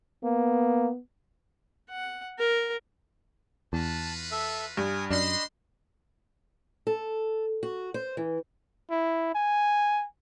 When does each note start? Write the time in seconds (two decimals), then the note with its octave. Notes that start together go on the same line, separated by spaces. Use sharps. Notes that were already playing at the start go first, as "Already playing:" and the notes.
0.24 A#3 B3
1.90 F#5
2.39 A#4
3.73 E2 F4 F#4 B4 A5
4.31 A4 E5
4.77 G2 G#5 D#6
5.10 F#2 D4 C5 D#5 B5 C6
6.87 A4
7.63 F#4
7.94 C5
8.17 E3
8.90 E4
9.35 G#5